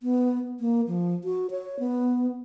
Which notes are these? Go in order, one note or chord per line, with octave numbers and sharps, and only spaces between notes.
B3
A#3
F3
F#4
C#5
B3